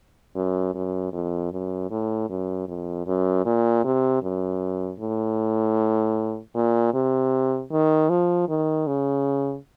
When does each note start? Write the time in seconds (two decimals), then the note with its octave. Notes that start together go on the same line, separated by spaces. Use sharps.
0.36 F#2
0.74 F#2
1.13 F2
1.52 F#2
1.91 A2
2.29 F#2
2.68 F2
3.06 F#2
3.46 A#2
3.84 C3
4.23 F#2
5.00 A2
6.55 A#2
6.94 C3
7.71 D#3
8.09 F3
8.49 D#3
8.87 C#3